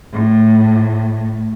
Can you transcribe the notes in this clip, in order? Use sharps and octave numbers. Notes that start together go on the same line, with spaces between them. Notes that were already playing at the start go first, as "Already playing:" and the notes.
A2